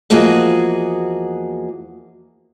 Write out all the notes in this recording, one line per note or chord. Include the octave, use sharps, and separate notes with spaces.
E2 F3 A#3 F#4 G#4 D#5